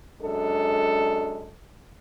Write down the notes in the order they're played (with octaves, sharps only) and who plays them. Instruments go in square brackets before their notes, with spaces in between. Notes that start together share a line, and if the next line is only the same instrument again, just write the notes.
[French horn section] F#2 G#3 D4 A4